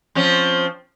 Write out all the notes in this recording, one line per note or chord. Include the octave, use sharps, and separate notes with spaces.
F3 C4 C#4